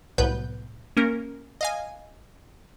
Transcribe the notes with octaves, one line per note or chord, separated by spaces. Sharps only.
C2 A2 F#3 B3 B4 G6
A#3 C#4 A#4
D#5 F5 G#5